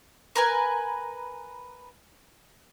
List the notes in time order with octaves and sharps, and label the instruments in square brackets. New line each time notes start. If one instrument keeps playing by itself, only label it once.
[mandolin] A#4 B4 G#5